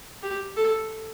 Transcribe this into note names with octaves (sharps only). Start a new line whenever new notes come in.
G4
A4